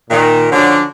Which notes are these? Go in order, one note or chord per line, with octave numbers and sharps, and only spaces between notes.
A#2 D#3
D3 F3 F#3 C#4 D4 F#4